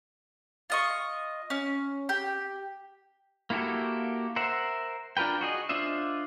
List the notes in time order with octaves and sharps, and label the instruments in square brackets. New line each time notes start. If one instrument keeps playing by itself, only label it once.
[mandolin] F4 D#5 C#6
C#4
G4
[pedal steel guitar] A#3 E4 F#4 G4 A4
A#4 C5 E5 F#5
D4 F4 A#4 B4 G5
F#4 G#4 D#5
D4 F4 C5 D#5 E5